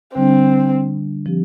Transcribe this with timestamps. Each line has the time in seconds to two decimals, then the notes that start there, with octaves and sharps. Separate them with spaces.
0.15 D3 G3 C4 D4
1.26 F3 C4 G4